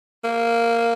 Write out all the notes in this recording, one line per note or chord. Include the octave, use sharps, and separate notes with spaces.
A#3